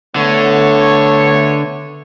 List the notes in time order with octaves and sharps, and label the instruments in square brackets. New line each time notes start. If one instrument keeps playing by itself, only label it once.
[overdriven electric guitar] D3 [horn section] A3 B3 C#5